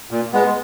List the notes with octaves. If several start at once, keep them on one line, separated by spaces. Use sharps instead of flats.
A#2
G#3 B3